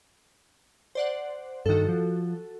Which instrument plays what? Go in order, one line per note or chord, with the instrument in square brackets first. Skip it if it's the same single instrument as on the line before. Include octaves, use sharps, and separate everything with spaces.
[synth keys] C5 D5 F#5
[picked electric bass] G2 D#3 [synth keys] F#4 A4
[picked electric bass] F3